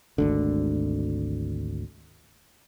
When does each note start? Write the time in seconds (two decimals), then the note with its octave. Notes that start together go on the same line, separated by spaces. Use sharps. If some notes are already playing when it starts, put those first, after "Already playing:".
0.18 G#1 D2 D3